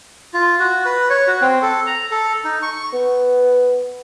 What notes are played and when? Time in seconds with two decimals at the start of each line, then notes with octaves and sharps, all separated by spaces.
0.34 F4
0.60 F#4
0.85 B4
1.10 C#5
1.28 F#4
1.42 C4
1.62 A4
1.87 A#5
2.11 A4
2.44 D#4
2.62 C#6
2.93 B3